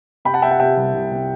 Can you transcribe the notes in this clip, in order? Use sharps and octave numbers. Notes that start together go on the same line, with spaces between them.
C3 G5 B5
F#5 A5
C3 E5 G5
F#5 A5
C3 E5 G5
C2
C2
C3